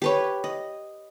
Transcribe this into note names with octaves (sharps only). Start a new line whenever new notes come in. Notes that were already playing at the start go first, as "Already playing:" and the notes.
G4 B4 C#5
D#5